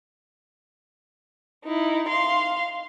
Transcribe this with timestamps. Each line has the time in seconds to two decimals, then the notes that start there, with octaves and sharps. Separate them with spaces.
1.65 D#4 E4
2.09 F5 C6